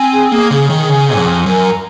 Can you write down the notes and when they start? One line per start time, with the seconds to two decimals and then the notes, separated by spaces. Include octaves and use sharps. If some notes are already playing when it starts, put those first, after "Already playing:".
Already playing: C4 G#5
0.12 G#4
0.32 A#3 G#4
0.51 C#3 G#4
0.70 D#3 G#4
0.89 C#3 G#5
1.08 G#5
1.17 F2
1.27 G#5
1.46 F#2 A#4
1.65 A#5